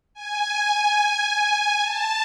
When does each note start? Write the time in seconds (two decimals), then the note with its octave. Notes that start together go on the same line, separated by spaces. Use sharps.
0.14 G#5
1.81 A5